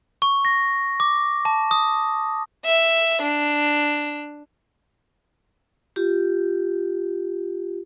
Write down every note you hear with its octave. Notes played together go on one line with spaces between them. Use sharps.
C#6
A#6
D6
A5
D#6
E5
D4
F4 G4